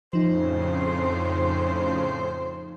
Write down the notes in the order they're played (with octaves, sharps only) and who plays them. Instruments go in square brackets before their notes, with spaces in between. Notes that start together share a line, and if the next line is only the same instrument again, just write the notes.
[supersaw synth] F2 A2 C#3 [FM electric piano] F3 D#4 [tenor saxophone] C5